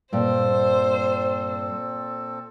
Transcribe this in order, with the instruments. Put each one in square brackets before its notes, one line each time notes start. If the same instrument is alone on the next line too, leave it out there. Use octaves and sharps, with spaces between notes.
[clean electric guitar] G2 [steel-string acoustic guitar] A#2 [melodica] C4 A4 [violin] C5